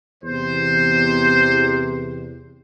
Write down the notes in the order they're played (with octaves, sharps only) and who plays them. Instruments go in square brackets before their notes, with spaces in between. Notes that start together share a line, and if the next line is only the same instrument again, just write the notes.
[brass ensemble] E2 [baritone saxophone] C3 [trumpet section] C5